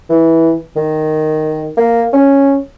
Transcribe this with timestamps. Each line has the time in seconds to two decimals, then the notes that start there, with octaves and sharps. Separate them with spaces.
0.10 E3
0.76 D#3
1.77 A#3
2.13 C#4